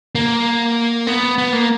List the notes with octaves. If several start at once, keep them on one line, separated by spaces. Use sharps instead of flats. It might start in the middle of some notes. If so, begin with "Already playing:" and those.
A#3
B3
B3
A#3